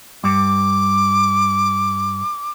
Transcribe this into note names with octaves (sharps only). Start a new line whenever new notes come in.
G2 D6